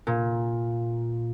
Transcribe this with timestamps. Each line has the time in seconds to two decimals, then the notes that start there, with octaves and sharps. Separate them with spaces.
0.07 A#2